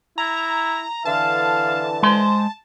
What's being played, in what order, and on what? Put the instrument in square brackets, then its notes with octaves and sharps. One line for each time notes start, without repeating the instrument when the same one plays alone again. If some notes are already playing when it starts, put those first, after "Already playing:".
[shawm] E4 [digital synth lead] A#5
[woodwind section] D3 E3 [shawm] F5 [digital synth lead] A5
[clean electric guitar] G#3 C6 [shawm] C5